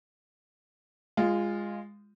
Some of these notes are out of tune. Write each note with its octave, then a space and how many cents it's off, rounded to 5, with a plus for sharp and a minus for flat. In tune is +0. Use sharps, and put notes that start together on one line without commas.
G#3 -15 F4 +0